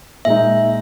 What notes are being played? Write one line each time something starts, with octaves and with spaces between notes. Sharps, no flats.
A#2 G#3 D#4 E5